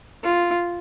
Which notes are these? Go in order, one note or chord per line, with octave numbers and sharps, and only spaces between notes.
F4